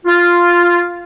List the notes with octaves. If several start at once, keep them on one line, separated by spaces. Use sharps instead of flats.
F4